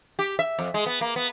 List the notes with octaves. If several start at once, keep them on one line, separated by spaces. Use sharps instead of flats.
G4
E5
F2
G#3
B3
A#3
B3